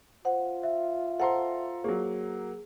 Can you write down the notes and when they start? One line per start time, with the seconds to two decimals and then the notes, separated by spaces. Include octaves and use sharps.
0.25 F4 C5 F#5
0.63 E5
1.20 A4 C5 F#5 A#5 C6
1.84 F#3 A#3 G#4